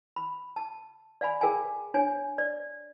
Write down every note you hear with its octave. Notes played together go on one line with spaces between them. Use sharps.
B5
A5
D5 F5 G#5 B5
G#4 A#4 F5 G5 G#5
D4 C#5 G#5
D5